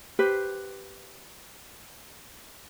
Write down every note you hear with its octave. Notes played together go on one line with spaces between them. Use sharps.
G4 B4 C5